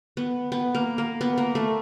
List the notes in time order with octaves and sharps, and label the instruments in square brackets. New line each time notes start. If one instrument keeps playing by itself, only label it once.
[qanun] B3
B3
A#3
A#3
B3
A#3
A3